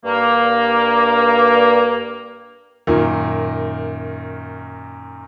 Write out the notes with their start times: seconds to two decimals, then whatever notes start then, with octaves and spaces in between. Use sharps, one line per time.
0.05 G2 A#3
2.87 F#2 A#2 D#3